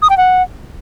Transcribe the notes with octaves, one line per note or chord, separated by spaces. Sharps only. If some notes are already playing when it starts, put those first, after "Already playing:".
D#6
G5
F#5